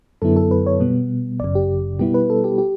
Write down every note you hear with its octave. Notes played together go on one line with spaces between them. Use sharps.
F#2 D3 F#3 B3 E4 A4
A4
B4
C#5
B2 G3 B3
G1 F#2 C#3 D5
G4
B2 G3 B3 E4 G4
B4
A4
G4
G4